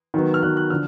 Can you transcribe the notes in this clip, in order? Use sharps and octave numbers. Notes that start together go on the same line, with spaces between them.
D#3 F#3 B3
F6
D#3 F#3 B3 F#6
F#6
D3 F3 F6